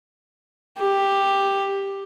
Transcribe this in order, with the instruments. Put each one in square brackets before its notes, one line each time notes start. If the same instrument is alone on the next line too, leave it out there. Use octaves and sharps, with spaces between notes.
[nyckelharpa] G4